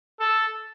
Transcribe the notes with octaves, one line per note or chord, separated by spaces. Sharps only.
A4